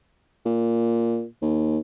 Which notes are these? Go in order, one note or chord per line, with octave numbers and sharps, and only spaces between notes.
A#2
D#2